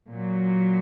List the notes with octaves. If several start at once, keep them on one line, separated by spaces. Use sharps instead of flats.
A#2 F#3